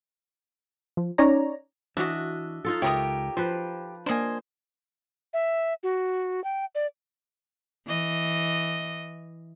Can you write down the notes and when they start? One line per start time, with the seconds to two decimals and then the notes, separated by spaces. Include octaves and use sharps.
0.97 F3
1.18 C#4 D#4 C#5 D5 A#5
1.97 E3 D4 F#4 D#5 E5
2.65 D#4 F4 A4
2.82 C#2 G4 A#4 C#5 E5 D#6
3.37 F3 B4 C5
4.06 A#3 D4 C5 D#5 G#5
5.33 E5
5.83 F#4
6.44 G5
6.75 D5
7.87 E3 D#5